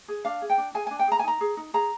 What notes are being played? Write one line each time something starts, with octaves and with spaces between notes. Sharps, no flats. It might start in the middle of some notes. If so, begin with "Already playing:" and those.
G#4
D4 F5
G#4
G5
D4
G#4 G#5
G#5
D4
G5
G#4 A#5
G#5
D#4 A#5
G#4
D#4
G#4 A#5